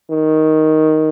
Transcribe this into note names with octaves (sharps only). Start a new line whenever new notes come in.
D#3